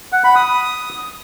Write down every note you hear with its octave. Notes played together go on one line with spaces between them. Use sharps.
F#5
B5
D#6